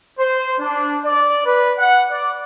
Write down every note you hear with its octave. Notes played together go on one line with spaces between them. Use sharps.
C5
D4
D5
B4
F#5
D5